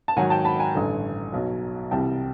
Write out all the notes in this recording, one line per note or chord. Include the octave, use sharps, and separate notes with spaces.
A5
G#2 D#3 F#3 F#5 G#5
G5 A5
A5 B5
G#5 A#5
A1 G2 D3
B1 B2 F#3
C2 C3 E3 G3 G5 A5